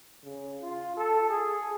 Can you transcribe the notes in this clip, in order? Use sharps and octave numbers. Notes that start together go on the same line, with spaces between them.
C#3
F4
A4
G#4